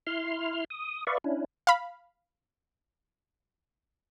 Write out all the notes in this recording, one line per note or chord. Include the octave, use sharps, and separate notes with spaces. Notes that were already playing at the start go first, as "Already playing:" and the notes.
E4 C6 F6
D#6
B4 D5 E5 F5 C#6
C#4 D4 E4
F5 B5